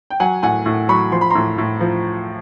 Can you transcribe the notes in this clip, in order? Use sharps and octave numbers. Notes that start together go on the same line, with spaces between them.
G5
F#3 F#5 G#5
A2 F#5 G#5
A2
F#3 B5 C#6
F3 C6
B5
A2 A#5 C6
A2
F3